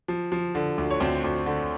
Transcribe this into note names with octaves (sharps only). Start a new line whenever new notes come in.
F3
F3
D3
D2
C#5
D2 C4 C5
D2
D3